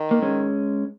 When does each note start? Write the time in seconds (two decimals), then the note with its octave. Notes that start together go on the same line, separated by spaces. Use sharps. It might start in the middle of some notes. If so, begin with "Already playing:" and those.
Already playing: D#3
0.11 A#3
0.22 G#3 C#4